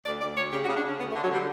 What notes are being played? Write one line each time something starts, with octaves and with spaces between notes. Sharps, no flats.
D2 D5
D2 D5
D2 C#5
C#3 G4
F#4
C#3
D4
C#3 C#4
D2 B3
A3
D3
F#3
D3 G3